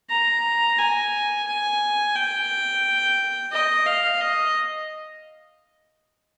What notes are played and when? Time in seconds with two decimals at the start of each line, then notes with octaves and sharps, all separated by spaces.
0.10 A#5
0.79 G#5
1.47 G#5
2.16 G5
3.52 D#5
3.86 F5
4.21 D#5